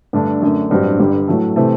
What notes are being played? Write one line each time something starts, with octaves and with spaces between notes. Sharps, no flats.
G2 D3 A3 D4
F#2 D3 A3
A1 G2 F#3 C4 G4
G1 G2 D3 G3
A2 F#3 A3
C3 E3 A3 C4